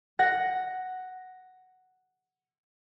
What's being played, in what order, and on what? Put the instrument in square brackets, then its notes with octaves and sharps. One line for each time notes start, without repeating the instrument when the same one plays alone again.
[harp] F#5 A#6